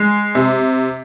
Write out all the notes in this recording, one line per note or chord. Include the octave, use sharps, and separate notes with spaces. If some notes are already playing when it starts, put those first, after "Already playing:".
Already playing: G#3
C3